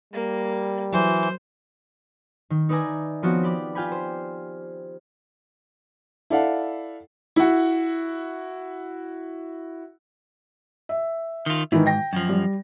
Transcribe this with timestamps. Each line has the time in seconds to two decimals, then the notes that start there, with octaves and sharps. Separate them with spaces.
0.14 G3 A#3
0.93 E3 F#3 C5
2.50 D#3
2.69 D#4 B4 D5 E5 G#5 A#5
3.22 F3 B3 C4 F4 F#4 C#5
3.43 G4 D5 B5 D6
3.75 F4 G4 F5 G5 G#5 B5
3.92 C5
6.30 E4 A4 D5 F5 F#5
7.36 E4 F#4
10.89 E5
11.46 D#3 F4
11.72 G#2 D#3 E3 E4
11.86 G5 A#6
12.13 F#2 F3
12.29 G3